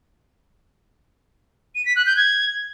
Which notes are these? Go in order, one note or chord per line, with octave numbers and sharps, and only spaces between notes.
D#7
B6
F#6
G6
G#6